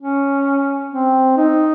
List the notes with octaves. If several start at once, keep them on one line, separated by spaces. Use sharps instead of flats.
C#4
C4
D#4